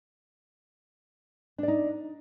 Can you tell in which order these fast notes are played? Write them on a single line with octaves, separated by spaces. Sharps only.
D4 D5 D#4